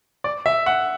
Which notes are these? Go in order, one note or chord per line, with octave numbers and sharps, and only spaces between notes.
D5
E5
F#5